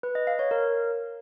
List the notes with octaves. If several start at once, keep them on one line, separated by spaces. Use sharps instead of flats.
B4
D#5
F5
C#5
A#4